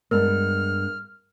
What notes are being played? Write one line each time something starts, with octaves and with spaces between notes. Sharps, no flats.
G2 G#3 B3 A#4 F6